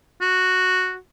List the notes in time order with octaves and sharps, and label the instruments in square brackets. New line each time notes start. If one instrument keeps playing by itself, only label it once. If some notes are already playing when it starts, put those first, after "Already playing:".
[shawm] F#4